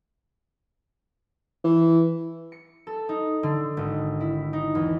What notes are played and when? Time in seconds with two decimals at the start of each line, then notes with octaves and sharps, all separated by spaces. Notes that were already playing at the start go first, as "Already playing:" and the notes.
1.64 E3
2.52 C#7
2.87 A4
3.09 D#4
3.43 D3
3.77 G#1
4.21 E4
4.53 D#4
4.75 E2